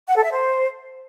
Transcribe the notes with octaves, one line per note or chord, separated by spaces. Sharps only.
F#5
A4
E5
C5